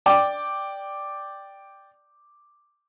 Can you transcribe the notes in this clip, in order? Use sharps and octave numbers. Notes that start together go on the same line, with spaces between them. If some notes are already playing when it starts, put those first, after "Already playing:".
D5 G5 D6